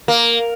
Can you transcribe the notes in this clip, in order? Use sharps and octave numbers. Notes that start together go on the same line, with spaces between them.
A#3